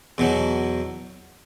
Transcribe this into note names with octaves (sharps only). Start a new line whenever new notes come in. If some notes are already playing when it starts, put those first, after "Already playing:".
E2 B2 F#3